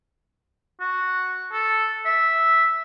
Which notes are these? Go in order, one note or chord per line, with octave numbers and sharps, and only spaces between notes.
F#4
A4
E5